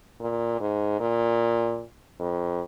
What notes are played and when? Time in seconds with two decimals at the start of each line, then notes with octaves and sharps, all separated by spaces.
0.20 A#2
0.60 G#2
1.00 A#2
2.20 F2